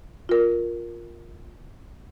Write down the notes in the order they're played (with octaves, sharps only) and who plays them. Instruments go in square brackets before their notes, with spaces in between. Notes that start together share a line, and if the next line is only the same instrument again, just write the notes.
[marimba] F4 A#4